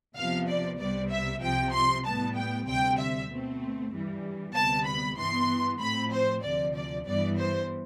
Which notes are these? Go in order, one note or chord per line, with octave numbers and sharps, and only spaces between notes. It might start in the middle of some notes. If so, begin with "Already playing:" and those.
E2 C3 F3 B3 F5
D5
C2 C3 G3 B3 D5
E5
C2 C3 F3 C4 G5
C6
A2 G3 B3 A5
G5
D2 C3 G3 C4 G5
E5
B2 A3 C4
G2 E3 G3
D2 C3 G3 B3 A5
B5
G2 E3 B3 C6
A2 F3 A3 C4 B5
C5
D2 C3 F3 D5
D5
G2 E3 G3 B3 D5
C5